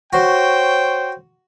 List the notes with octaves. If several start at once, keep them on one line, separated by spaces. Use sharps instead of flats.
F#4 C5 C#5 G5